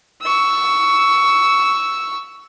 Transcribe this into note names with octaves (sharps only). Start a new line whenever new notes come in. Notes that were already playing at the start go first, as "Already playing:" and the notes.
C#6 E6